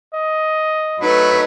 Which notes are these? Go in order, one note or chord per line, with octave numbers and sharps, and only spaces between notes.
D#5
F#3 A3 D#4 B4 B5